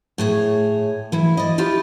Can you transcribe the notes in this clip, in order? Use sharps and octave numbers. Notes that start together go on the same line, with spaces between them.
A2 G#4 C#5
E3 E4
D5 D#5
E4 F4 G4